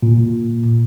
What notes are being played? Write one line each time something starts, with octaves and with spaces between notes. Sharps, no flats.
A#2